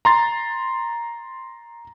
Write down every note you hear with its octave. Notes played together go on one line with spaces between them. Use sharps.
A#5 C6 A6